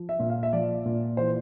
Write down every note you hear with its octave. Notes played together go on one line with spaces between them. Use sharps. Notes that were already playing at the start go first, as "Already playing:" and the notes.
Already playing: F3
E5
A#2
F5
E5
F3 D5
A#2
E3 C5